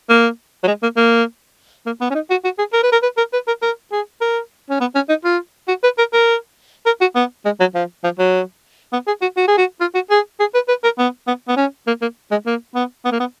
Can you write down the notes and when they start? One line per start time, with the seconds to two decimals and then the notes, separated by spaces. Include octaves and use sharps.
0.09 A#3
0.64 F#3
0.67 G#3
0.83 A#3
0.97 A#3
1.86 A#3
2.01 B3
2.10 C#4
2.15 D#4
2.30 F#4
2.44 F#4
2.58 G#4
2.73 A#4
2.83 B4
2.92 A#4
3.03 B4
3.17 A#4
3.33 B4
3.47 A#4
3.62 A#4
3.92 G#4
4.21 A#4
4.70 C#4
4.81 B3
4.95 C#4
5.09 D#4
5.24 F4
5.68 F#4
5.83 B4
5.98 A#4
6.13 A#4
6.86 A#4
7.01 F#4
7.15 B3
7.45 G#3
7.60 F#3
7.74 F3
8.04 F3
8.19 F#3
8.93 B3
9.07 G#4
9.22 F#4
9.36 F#4
9.48 G#4
9.58 F#4
9.81 F4
9.95 F#4
10.10 G#4
10.40 G#4
10.54 B4
10.68 B4
10.84 A#4
10.98 B3
11.27 B3
11.48 B3
11.57 C#4
11.87 A#3
12.02 A#3
12.31 G#3
12.46 A#3
12.75 B3
13.05 B3
13.12 A#3
13.20 B3